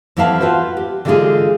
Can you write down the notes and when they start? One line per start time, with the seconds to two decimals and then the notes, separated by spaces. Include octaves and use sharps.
0.17 F2 E3 B3 E4 F5 A5
0.41 F4 F#4 B4 C5
0.77 G4
1.05 D3 E3 G3 G#3 F4 G#4